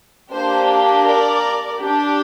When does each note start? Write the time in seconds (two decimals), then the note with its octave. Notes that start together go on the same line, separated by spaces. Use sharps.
0.32 A#3 D4 G4 C5
1.05 A#4 D5
1.77 D4 G4